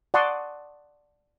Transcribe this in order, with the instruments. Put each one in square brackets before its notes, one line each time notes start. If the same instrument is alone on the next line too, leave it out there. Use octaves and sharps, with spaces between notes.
[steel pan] D5 F#5 A5 C6 C#6 D#6